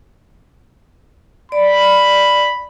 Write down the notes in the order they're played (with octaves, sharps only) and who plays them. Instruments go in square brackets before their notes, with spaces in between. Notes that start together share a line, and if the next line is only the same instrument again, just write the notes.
[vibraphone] D5 [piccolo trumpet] B5